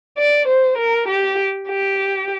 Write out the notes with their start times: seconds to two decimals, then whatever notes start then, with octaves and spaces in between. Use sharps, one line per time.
0.18 D5
0.48 C5
0.78 A#4
1.08 G4
1.69 G4